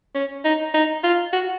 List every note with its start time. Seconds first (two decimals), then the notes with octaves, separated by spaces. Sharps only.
0.15 C#4
0.45 D#4
0.74 D#4
1.03 F4
1.33 F#4